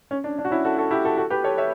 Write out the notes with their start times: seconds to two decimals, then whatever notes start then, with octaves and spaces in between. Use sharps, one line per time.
0.11 C#4
0.24 D4
0.39 D4
0.45 F#4
0.51 C#4 E4
0.65 F#4 A4
0.78 F#4 A4
0.91 E4 G4
1.04 F#4 A4
1.17 F#4 A4
1.30 G4 B4
1.44 A4 C#5
1.58 C#5 E5